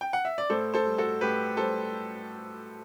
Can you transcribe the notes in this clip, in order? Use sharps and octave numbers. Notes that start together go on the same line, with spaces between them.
G5
F#5
E5
D5
A2 A4 C5
A4 C5
G3
F#4 A4
A2 G4 B4
G3 A4 C5